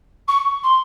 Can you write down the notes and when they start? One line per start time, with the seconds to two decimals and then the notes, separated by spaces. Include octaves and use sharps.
0.28 C#6
0.63 C6